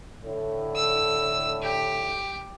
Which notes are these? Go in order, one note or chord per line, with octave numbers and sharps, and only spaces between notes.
A2 D3
E6
G4